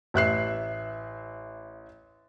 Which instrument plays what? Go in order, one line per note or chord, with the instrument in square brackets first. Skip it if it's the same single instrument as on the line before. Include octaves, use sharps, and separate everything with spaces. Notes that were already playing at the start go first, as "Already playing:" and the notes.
[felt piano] A1 E5 F#6 C7